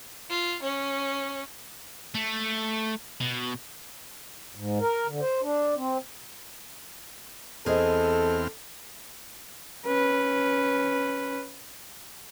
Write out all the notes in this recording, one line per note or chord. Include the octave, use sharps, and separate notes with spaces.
F4
C#4
A3
B2
G#2
A#4
D3
C5
D4
C4
E2 C4 G#4 A4 C5 D#5 F6
C#4 B4